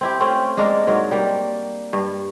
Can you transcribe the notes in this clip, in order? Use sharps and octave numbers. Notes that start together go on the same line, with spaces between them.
C4 E4 G4
A3 C4 C#4 F4
G#3 A#3 D4 A#4
G#2 F#3 A#4
G3 A#3
G2